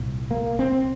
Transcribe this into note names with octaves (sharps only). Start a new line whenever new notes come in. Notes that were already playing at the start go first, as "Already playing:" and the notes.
Already playing: C2 A#2
A#3
C4